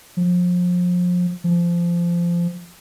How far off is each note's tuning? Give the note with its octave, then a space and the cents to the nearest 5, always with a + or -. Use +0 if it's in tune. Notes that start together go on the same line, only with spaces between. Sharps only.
F3 +30
F3 -20